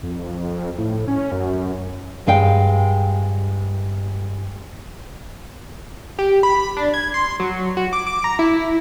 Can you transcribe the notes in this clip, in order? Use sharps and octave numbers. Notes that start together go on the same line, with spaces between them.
F2
A2
C#4
F#2
G2 G#3 F5 G5
G4
B5
D4
G#6
C6
F#3
F#4
D6
D6
A#5
E4